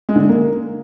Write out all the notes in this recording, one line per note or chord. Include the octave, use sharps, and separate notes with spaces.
G#3
D3
G#3
A#3